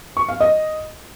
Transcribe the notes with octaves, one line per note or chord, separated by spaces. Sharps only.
C#6
F5
D#5